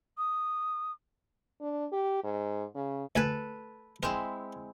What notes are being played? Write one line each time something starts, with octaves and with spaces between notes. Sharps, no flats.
D#6
D4
G4
G#2
C#3
D2 A4 B4 G#5 B5
G#3 C4 E4 A#4